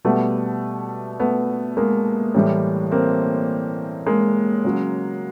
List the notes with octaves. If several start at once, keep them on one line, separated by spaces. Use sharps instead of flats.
B2 G3 A3 B3
A3 B3
G#3 A#3
A2 E3 G3
A#3 C4
G#3 A#3
C#3 F#3